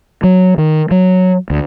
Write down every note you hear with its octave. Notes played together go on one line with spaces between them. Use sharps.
F#3
D#3
F#3
D2